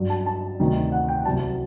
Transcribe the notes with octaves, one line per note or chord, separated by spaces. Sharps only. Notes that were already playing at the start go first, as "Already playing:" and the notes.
Already playing: G2 F#3
A5
A5
D2 C3 D#3
F#5
G5
C2 C3 F#3 A5